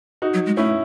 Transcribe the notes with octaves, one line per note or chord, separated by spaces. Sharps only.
D#4 F#4
F#3
G#3
A3 C#4 E4